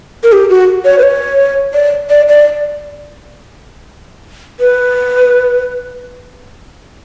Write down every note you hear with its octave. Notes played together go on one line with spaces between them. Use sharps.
A#4
G4
F#4
C#5
B4
C#5
D5
D5
D5
B4